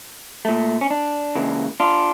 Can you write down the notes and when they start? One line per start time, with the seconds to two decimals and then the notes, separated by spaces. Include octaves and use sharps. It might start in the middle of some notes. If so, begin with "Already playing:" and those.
0.45 A#2 A3
0.81 C#4
0.90 D4
1.36 C#2 C#3 E3 A#3
1.80 D4 F4